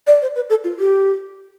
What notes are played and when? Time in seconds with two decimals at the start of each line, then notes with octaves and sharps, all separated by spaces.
0.07 D5
0.22 C5
0.35 B4
0.49 A4
0.64 F4
0.79 G4